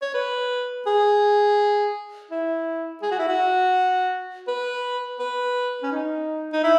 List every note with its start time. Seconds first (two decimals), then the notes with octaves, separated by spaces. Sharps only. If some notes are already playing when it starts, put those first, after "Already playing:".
0.02 C#5
0.14 B4
0.87 G#4
2.31 E4
3.02 G#4
3.12 F#4
3.20 E4
3.28 F#4
4.48 B4
5.19 B4
5.83 C#4
5.92 D#4
6.53 D#4
6.64 E4